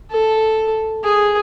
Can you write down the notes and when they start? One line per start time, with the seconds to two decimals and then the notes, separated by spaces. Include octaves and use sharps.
0.11 A4
1.04 G#4